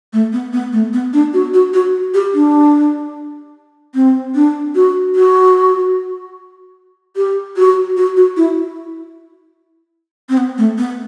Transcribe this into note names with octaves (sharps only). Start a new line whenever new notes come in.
A3
B3
B3
A3
B3
D4
F#4
F#4
F#4
G4
D4
C4
D4
F#4
F#4
G4
F#4
F#4
F#4
E4
C4
B3
A3
B3